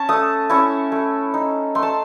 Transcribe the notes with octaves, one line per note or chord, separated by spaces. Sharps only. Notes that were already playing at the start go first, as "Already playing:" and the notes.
Already playing: C#4 A5 C#6
A3 D#6
C#4 E4 C#6
A3
D#4
A3 C6
A5